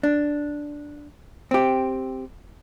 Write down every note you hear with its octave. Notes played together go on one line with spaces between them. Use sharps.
D4
C4 G4